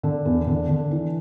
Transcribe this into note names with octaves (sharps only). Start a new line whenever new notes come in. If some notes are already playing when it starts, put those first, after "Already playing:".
D3
E2
D3
D3
E3